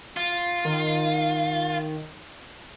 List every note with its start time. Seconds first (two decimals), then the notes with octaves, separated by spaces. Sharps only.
0.17 F4
0.65 D#3